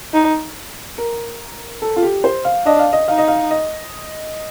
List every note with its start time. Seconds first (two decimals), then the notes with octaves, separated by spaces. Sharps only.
0.14 D#4
0.98 A#4
1.82 A4
1.96 F4
2.02 G4
2.24 C5
2.45 F5
2.66 D4 D#5
2.79 F5
2.93 D#5
3.08 D#4 F5
3.18 D#5
3.28 F5
3.51 D#5